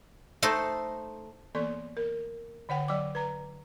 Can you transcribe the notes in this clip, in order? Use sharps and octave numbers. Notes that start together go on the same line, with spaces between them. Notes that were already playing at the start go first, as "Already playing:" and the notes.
A3 D#4 A4 C5
E3 A#3 B3 A4 D5 C6
A#4
D3 C#5 F#5 G5
F#3 D5 G5 D6
B4 A#5